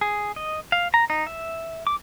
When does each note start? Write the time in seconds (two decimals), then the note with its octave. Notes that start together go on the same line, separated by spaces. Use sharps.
0.01 G#4
0.36 D#5
0.72 F5
0.94 A#5
1.10 D#4
1.27 E5
1.87 D6